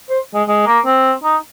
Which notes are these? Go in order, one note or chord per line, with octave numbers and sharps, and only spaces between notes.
C5
G#3
G#3
A#3
C4
D#4